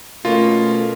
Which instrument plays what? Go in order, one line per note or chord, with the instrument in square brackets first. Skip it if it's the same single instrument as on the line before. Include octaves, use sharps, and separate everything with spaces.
[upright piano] B2 A#3 C#4 [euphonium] A3 [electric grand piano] F4